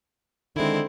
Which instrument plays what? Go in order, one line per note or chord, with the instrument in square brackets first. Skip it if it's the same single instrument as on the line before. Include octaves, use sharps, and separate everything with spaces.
[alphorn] D3 [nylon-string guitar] D#3 G#3 [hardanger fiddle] C4 E4